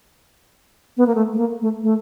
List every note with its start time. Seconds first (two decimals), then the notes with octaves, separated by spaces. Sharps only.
0.97 B3
1.06 A#3
1.15 A3
1.33 A3
1.38 A#3
1.61 A3
1.83 A3